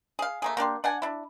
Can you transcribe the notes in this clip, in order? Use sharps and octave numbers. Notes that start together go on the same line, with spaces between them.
G#4 F5
A3 A#3 G#4
A#3 D4 G4 C6
D4 F#5 G#5
D4 E4